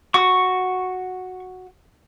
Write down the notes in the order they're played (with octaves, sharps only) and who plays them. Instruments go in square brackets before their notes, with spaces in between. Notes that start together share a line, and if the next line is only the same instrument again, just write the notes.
[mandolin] F#4 [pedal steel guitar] C#6